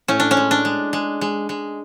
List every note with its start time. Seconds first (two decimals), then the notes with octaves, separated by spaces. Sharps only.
0.08 A2 C#4
0.20 D4
0.31 C#4
0.37 G#3
0.51 D4
0.65 G#3
0.93 G#3
1.21 G#3
1.49 G#3